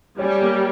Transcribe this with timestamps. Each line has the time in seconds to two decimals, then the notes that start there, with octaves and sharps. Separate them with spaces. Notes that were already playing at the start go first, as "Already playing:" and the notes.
0.19 G3 C#4
0.42 A#3